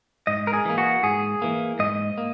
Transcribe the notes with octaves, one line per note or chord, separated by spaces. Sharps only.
G#2 D#5
A#4
G#4
E3 A#3
F#4
G#2 G#4
E3 A#3
G#2 D#5
A#3